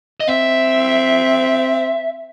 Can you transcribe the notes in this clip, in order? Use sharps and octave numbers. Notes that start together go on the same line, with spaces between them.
D#5
C4 E5